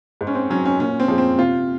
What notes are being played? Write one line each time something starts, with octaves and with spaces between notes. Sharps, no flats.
G#2
C#4
C4
F#3 C#4
C#4
A#2 C#4
C4
F3 G#3
C4
C3 F4